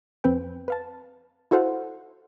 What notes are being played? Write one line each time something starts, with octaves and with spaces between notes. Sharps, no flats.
F2 C4 B4 G5
B4 F5 A5
E4 F#4 A4 C5 F5 F#5